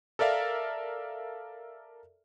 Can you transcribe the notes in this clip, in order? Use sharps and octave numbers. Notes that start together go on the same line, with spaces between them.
A4 A#4 D5 E5 F5